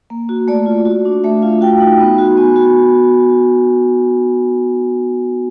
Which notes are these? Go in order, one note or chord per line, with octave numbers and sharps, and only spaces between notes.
A#3
F#4
A3 D5
F4
F#4
D4
A3 E5
F4 F5
F#4 G5
D#4
B3
F#4
B3 G#5
F#4